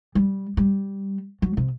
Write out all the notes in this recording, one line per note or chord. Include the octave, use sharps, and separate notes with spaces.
G3
G3
F#3
C3